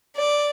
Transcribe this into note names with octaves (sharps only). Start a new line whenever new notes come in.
D5